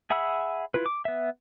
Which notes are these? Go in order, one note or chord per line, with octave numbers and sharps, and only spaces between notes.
G#4 E5 F#5 B5 E6
E4 F4 B4
D6
B3 E5